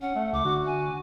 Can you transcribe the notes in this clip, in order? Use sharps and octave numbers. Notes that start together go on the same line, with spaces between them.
C#4 F#5
A3
C#2 D6
D3 F#4
G#5